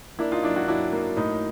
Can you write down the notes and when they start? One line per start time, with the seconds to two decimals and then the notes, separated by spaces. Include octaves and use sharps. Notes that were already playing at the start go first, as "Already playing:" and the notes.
0.19 A#3 D4 E4
0.32 D#4 F4
0.43 F#3 D4 E4
0.56 E4 F#4
0.68 F#3 D4 E4
0.92 A#3
1.17 A2 D#4